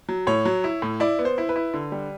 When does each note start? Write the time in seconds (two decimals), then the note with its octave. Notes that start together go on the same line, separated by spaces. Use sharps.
0.09 F#3
0.27 A2 C#5
0.45 F#3
0.64 E4
0.82 A2
1.00 E4 D5
1.19 B3
1.25 C5
1.38 E4
1.49 B4
1.56 E4
1.74 D3
1.92 G3